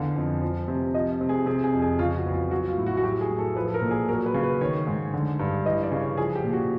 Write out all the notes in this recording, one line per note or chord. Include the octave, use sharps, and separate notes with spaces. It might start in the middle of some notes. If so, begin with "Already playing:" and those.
Already playing: E2 D3 F5
F2
F3
C3
F3 D#5
C3
G#4
C3 G#4
G#4
F2
G#4
C#3 F4
F#4
E2
F4
F#3 F#4
F4
A2
F#4
F#4
F#3 G4
G#4
A2
A4
F3 B4
A4
A#4
A#2
G#4
F#3 A#4
B4
C#3
B4
D#3 C#5
G#2
D3
G2
E3 D#5
D5
C#3
C#5
F3 G#4
G4
A#2
F#4